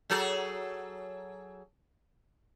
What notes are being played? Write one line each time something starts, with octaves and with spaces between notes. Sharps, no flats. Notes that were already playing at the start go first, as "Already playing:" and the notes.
F#3 G#4 A4